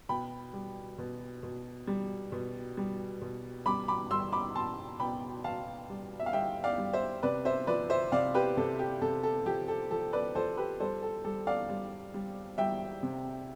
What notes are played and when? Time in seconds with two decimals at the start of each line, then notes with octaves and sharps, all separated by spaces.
0.09 B2 G5 B5
0.53 G3
0.98 B2
1.43 B2
1.87 G3
2.32 B2
2.77 G3
3.21 B2
3.66 G3 B5 D6
3.88 B5 D6
4.11 G3 C6 E6
4.32 B5 D6
4.55 B2 A5 C6
5.00 B2 G5 B5
5.44 B2 F5 A5
5.89 G3
6.20 E5
6.26 F5
6.33 G3 E5 G5
6.64 D5 F5
6.78 G3
6.93 C5 E5
7.23 C3 B4 D5
7.45 C5 E5
7.67 F3 B4 D5
7.90 C5 E5
8.12 C3 D5 F5
8.34 G4 B4
8.57 C3 A4
8.79 G4
9.01 C3 A4
9.23 A4
9.46 F3 G4
9.68 A4
9.91 F3 A4
10.13 B4 D5
10.35 F3 A4 C5
10.57 G4 B4
10.80 G3 A4 C5
11.02 A4
11.24 G3 A4
11.47 D5 F5
11.69 G3
12.14 G3
12.58 G3 E5 G5
13.03 C3